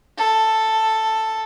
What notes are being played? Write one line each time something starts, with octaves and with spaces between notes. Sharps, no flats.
A4